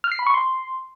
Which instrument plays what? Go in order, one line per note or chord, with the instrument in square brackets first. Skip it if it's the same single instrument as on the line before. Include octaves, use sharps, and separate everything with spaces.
[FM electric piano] F6
C7
B5
C#6
C6